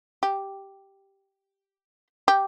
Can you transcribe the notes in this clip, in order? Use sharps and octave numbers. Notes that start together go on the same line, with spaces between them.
G4
G4